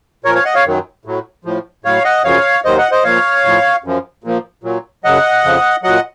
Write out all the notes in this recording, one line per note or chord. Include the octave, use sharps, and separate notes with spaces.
A#2 F3 A#4 C#5
C#5 F5
D#5 F#5
C#5 F5
F#2 D#3 F#3
A2 F#3
A2 F3
A2 F#3 C#5 F5
D#5 F#5
F#2 C#3 F3 C#5 F5
D#2 D#3 F#3 C5 D#5
D#5 F#5
C5 D#5
A#2 F3 C#5 F5
A2 F3
F#2 F3
A#2 F3
A#2 F#3
F#2 C#3 F#3 D#5 F#5
F2 C#3 F3
A#2 F#3 D#5 F#5